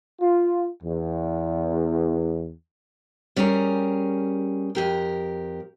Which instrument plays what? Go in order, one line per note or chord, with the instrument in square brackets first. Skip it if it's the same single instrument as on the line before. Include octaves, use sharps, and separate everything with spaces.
[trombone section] F4
E2
[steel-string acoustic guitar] G3 C#4 G4 G#4 A#4
F2 G4 A#4